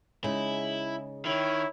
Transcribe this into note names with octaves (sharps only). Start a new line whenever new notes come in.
C#3 G#3 D#4 E4
D#3 E4 C#5